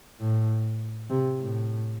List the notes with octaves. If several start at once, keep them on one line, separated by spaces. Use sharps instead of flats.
A2
C3
A2